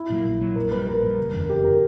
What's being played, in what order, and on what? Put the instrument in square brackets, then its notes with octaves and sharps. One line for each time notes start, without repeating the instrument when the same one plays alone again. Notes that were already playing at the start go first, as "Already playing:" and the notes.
Already playing: [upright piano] E4
[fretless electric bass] A#2 F#3 A#3
A#1
A#2 F#3 A#3
[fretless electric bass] A#1 [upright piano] A#4
[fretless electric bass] A#2 [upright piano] B4
[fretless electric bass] G3
[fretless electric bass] A#1 [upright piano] A#4
[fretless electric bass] A#2 G3
F#1
E2 D3
[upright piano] A#4
[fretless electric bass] F#1 [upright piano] G4
[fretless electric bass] D3 [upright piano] A#4